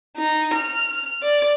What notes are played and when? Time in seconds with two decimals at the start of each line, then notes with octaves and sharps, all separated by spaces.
0.17 D#4
0.54 F6
1.23 D5